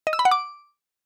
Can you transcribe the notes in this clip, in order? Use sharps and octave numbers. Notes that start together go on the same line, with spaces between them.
D#5
E6
B5
F#5
D6